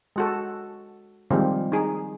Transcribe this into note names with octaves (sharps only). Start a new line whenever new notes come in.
G#3 F#4 A4
D#3 F3 G3 G#3 A#3 C4
D#4 G#4